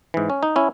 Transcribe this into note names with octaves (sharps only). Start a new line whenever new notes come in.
G#2 E3
C#4
D#4
C#4 E4